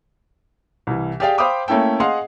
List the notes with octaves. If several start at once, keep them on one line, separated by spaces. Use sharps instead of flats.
C2 E3
G4 G#4 D5 F5 G5
C5 F5 G5 B5 D6 D#6
A3 A#3 C#4 E4 A4 G5
G#4 D#5 F5 F#5 C6